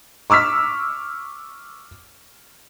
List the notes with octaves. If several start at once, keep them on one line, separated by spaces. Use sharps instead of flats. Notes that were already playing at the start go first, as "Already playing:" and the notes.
C#6 D6 E6 F6 B6